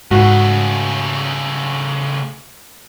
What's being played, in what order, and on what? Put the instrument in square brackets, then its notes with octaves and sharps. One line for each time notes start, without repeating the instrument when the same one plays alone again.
[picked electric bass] G#2 [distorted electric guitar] C#3 A3 [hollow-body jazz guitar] F#4